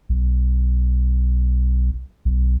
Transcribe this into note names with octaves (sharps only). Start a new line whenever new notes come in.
B1
B1